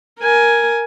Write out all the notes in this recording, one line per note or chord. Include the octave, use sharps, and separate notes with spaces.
A#4 G#5